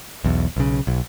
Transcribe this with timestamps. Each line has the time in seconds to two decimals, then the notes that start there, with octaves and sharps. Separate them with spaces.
0.24 B1 E2
0.56 B1 C#3
0.87 B1